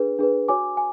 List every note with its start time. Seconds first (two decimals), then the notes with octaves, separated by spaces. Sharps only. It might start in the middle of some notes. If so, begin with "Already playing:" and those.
Already playing: D4 G#4 B4
0.19 D4 G#4 B4
0.48 F#4 C#5 G#5 D6
0.77 G#5